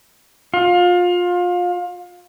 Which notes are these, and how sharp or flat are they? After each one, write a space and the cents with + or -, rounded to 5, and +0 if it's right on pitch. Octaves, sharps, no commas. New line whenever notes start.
F4 +25